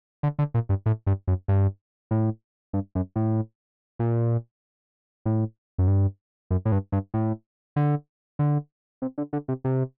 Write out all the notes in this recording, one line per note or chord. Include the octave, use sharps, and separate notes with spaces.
D3
D3
A#2
G2
A2
G2
F#2
G2
A2
G2
F#2
A2
A#2
A2
F#2
G2
F#2
A2
G2
G2
A2
D3
D3
C3
D3
D3
C3
C3